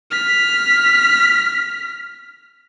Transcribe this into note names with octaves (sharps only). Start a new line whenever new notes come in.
F6 B6